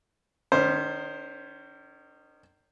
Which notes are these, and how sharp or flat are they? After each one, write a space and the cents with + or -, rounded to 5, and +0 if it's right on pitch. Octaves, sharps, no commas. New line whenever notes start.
D#3 -30 C#4 +25 C5 +5